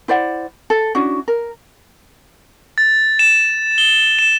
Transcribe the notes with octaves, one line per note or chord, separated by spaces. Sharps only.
E4 C5 D5 F#5
A4
C#4 D4 E4 F#4
A#4
A6
E7
G7
E7